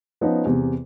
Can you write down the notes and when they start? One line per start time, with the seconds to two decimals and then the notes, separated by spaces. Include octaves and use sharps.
0.21 F3 B3 C#4 D#4
0.45 E2 C3